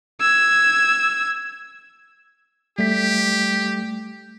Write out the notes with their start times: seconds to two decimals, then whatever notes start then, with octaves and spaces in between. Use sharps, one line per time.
0.21 E6 G#6
2.79 G3 A3 G4 B6